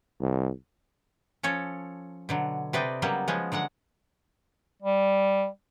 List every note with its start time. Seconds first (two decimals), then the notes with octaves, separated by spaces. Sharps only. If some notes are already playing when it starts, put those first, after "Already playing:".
0.20 C2
1.43 F3 C#4 A4 C#5
2.29 B2 D3 F#3
2.73 C3 B4 D5 D#5 G5
3.02 C#3 F#3 G3 A#3 B3
3.28 F3 G#3 B3 C#4
3.52 D3 F#3 G#3 F#5
4.82 G3